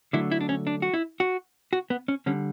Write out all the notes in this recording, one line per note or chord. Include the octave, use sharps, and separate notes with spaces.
D3 F#3 A3 E4
E4
D4
C#4
D4
F#4
E4
F#4
F#4
B3
C#4
D3 G3 C#4